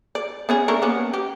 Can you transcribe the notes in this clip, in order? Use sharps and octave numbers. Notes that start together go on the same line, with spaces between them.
D5
B3 C#4 G#4
A3 D4 A#4
A#3 B3 C#4
G4